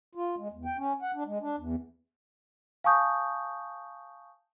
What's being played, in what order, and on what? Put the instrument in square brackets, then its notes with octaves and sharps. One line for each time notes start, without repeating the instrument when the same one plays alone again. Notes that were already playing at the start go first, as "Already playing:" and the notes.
[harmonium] F4
G#3
E2
G5
C#4
F#5
D4
G#3
D4
E2
[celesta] F5 G#5 A5 C#6 D#6 G6